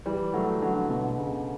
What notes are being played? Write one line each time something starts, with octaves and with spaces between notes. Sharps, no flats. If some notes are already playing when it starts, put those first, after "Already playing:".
E3 G3
F#3 A3
D3 F#3
B2 D3
B2
C#3